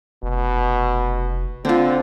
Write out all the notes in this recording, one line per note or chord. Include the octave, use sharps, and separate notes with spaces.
F1 B2
D3 C4 F4